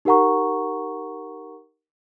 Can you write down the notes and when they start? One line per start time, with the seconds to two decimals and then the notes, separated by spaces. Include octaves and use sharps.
0.05 D#4 G4 A#4 F#5 A#5 C#6